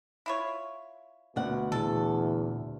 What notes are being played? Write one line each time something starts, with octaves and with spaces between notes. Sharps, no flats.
E4 F4 C#5
D2 B2 F#5
E2 A#2 A4